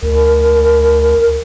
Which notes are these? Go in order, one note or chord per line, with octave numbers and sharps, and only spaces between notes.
D2 A#4